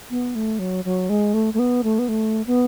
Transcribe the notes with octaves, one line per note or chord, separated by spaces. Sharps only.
B3
A3
F#3
F#3
G#3
A3
A3
B3
A3
B3
A3
B3